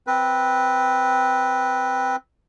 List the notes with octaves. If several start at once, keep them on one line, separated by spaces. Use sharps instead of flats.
C4 B4